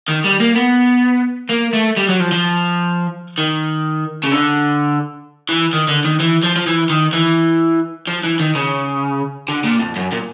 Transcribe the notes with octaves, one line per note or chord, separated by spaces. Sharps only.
D#3
G3
A#3
B3
A#3
A3
G3
F#3
F3
F3
D#3
C#3
D3
E3
D#3
D3
D#3
E3
F3
F3
E3
D#3
E3
F3
E3
D#3
C#3
D3
A#2
F2
F#2
A#2